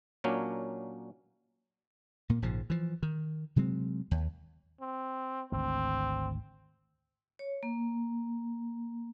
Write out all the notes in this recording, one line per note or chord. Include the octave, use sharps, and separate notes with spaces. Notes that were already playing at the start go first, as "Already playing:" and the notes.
A#2 F#3 A#3 C#4 D4
A#2 A#3
A#1 G#2 C#3 F3
E3 F3
D#3
C3 F#3 G#3 C4
D#2
C4
G#1 D2 C4
C#5
A#3